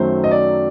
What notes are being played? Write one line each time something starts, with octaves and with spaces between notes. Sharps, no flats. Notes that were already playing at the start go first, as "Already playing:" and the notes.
Already playing: F#2 D#3 F#3 A3 C5
D#5
D5